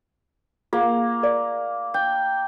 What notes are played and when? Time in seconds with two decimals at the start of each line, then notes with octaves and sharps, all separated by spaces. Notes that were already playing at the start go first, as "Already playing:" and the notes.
0.73 A#3 F4 G#4 F#5
1.23 A#4 D5 F5
1.94 G5